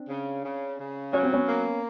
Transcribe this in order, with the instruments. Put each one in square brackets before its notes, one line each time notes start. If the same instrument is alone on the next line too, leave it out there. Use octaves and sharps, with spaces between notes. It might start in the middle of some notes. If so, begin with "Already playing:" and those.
Already playing: [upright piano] C4 D4
[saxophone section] C#3
C#3
C#3
[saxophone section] F#3 [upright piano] C#4
[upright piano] C4
B3 C#4
[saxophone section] A#3